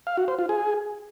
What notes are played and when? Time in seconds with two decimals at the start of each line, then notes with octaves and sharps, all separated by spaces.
0.07 F5
0.17 F#4
0.28 C5
0.39 F4
0.49 G#4